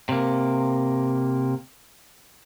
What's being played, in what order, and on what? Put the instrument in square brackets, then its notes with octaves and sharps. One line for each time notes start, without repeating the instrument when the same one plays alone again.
[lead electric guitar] C3 A#3